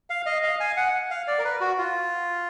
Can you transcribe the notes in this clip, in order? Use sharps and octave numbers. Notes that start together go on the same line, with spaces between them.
F5
D#5
F5
G#5
F#5
F5
D5
A#4
B4
F#4
F4